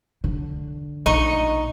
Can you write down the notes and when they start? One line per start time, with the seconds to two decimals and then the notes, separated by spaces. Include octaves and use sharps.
0.24 D3
1.06 A#1 D#4 D#5 C#6